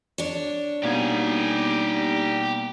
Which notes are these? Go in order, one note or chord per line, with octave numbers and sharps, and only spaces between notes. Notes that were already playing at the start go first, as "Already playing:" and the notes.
D4 C#5
B2 G3 A#3 B3 D#4 G4 G#5